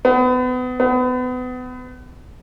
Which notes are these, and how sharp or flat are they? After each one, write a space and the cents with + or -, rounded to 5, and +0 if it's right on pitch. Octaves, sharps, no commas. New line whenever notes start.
B3 +30
B3 +30